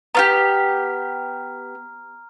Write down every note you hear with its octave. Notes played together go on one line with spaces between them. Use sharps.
B3 F4 G4 A#5 F6